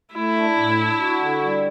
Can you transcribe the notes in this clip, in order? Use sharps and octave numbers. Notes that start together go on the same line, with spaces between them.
A3 E4
D4
A2
D4
F#4
D3
G3